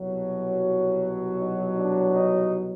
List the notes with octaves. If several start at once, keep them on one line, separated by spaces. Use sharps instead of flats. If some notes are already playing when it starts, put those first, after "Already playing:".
Already playing: C2 B2 F#3
D#4
D4
D#4